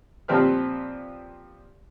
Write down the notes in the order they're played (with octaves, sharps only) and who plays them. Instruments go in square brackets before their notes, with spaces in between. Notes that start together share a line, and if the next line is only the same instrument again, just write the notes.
[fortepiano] A#2 F3 C4 G4 B4 F6